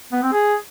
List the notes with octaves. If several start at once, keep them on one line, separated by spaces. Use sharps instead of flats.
B3
C4
G#4